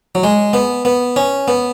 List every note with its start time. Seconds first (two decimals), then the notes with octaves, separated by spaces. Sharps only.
0.15 F#3
0.24 G#3
0.53 B3
0.85 B3
1.16 C#4
1.48 B3